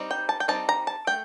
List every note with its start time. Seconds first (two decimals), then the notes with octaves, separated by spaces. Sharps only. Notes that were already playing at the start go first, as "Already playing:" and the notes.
Already playing: G3 C4 D#4
0.11 G5
0.29 A5
0.40 G5
0.48 G3 C4 D#4 A5
0.69 A#5
0.87 A5
1.07 A3 G5